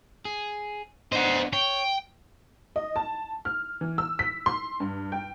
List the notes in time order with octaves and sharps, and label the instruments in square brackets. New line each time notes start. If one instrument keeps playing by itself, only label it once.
[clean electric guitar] G#4
[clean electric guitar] B3 D4 D#5 [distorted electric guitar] C5 F#5
[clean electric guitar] C#5 [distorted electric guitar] G5
[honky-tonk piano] D#5
A5
F6
E3
E6
B6
C6
G2
G5